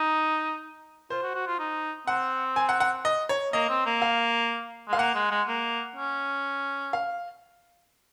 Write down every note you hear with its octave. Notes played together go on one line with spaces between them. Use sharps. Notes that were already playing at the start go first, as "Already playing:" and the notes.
Already playing: D#4
F4 C5
F#4
F#4
F4
D#4
C4 F#5
G#5
F#5
F#5
D#5
C#5
A#3 D#5
C4
A#3
F5
G#3 F5
A#3 F#5
G#3
G#3
A#3
C#4
F5